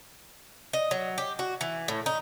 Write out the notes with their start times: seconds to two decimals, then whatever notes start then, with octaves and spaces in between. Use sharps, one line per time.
0.73 D#5
0.91 F#3
1.18 G4
1.39 F#4
1.61 E3
1.88 A2
2.06 D#4